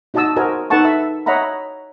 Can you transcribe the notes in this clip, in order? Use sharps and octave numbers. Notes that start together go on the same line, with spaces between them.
D#4 F#4 D#5 A5 D#6 E6
F#4 A#4 C5 D#5 G#5 A#5
D#4 A4 B4 F#5 A5 C#6
E5 E6
C#5 D#5 E5 F#5 A#5 B5